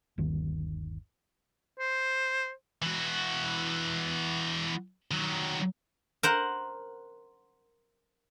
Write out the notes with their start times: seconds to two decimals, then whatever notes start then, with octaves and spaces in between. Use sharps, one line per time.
0.18 G1 D#2 D#3
1.79 C5
2.82 E3 F#4
5.11 D#3 F#3
6.23 A#4 C5 F#5